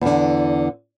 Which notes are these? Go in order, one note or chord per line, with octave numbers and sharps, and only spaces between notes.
E2 D3